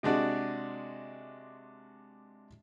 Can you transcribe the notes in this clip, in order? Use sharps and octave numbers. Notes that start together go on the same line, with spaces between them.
C3 G#3 D4 F#4